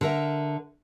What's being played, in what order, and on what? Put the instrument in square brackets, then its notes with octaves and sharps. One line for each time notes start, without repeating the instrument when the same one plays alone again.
[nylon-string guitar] D3 A#4 E5